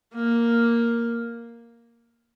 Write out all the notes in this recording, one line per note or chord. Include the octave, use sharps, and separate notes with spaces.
A#3